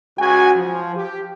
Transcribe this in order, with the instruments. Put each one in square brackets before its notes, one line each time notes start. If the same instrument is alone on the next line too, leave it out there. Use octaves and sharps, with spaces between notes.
[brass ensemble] C#2 F#4 G#5
F3
G4